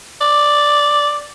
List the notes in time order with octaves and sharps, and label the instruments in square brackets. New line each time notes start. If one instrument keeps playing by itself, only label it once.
[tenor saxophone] D5